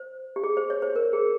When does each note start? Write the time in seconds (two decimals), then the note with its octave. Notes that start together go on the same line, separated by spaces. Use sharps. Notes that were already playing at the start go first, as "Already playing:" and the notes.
Already playing: C5
0.36 G4
0.44 G#4
0.57 C5
0.70 C#5
0.82 C5
0.96 A#4
1.13 G#4